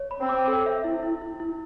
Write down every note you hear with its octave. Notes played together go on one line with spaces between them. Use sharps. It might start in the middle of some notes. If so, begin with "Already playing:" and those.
Already playing: C#5
B5
C4
D6
A4
E5
E4
E4
E4
E4